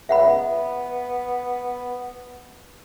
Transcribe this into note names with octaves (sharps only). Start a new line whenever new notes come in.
C#2 E5 F#5 B5
B3